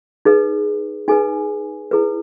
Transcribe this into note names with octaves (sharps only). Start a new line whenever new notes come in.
D#4 G#4 B4
D#4 G#4 B4 G#5
E4 G#4 B4